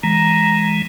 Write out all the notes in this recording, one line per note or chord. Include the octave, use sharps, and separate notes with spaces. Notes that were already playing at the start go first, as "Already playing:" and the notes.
E3 G#3 A#5